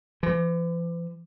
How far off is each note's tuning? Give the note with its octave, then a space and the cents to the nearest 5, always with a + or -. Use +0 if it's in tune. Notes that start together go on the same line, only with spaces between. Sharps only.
E3 +45